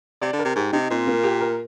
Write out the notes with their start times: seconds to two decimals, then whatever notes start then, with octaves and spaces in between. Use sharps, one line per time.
0.22 C3 D5
0.33 D3
0.39 A#4
0.44 C3
0.55 G#2 G4
0.73 C3 D#4
0.90 A#2 C4
1.07 A#3
1.24 G4
1.41 A#4